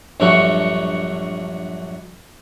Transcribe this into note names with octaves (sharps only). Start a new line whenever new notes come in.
A#1 G2 F#3 A3 F#5 C#6